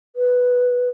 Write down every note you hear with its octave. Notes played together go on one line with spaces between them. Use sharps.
B4